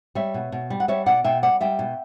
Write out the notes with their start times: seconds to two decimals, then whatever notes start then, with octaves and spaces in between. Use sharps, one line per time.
0.15 G3 C#5 E5
0.34 B2
0.52 B2
0.70 G3
0.80 F#5
0.88 G3 C#5 E5
1.06 B2 D5 F#5
1.24 B2 E5 G5
1.42 G3 D5 F#5
1.61 G3 E5 G5
1.79 B2